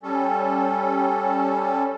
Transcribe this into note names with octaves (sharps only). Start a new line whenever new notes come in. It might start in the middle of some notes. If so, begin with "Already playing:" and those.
G3 C#4 A4